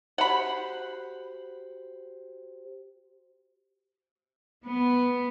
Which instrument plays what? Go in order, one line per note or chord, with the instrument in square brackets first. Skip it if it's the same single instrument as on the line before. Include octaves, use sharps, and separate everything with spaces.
[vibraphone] F#4 G4 C5 [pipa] F#5 B5
[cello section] B3